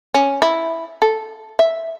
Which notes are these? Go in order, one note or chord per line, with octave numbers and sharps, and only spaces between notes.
C#4
E4
A4
E5